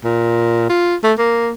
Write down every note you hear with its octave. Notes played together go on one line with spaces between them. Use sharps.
A#2
F4
A3
A#3